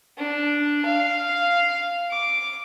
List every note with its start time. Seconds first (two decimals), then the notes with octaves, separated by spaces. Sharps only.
0.18 D4
0.85 F5
2.11 D6